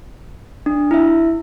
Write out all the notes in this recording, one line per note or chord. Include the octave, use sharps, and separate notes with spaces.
D4
E4 E5